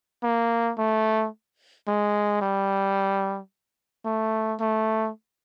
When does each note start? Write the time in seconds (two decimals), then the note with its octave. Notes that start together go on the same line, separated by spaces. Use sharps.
0.23 A#3
0.78 A3
1.88 G#3
2.42 G3
4.05 A3
4.60 A3